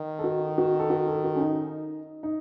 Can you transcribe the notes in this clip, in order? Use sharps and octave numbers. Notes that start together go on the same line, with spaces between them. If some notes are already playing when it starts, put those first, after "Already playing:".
Already playing: D#3
A4
F#4
F#4
A4
F#4
A4
F#4
C#4
D#4
D#4